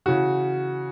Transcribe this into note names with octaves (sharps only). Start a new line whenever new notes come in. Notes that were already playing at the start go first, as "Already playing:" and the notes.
C#3 E3 F#4